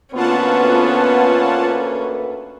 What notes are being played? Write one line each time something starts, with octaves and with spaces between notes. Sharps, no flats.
D2 A#3 B3 C#4 F4 B4 F#5 A5